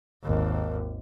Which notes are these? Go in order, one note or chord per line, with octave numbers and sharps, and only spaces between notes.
G#1 D#2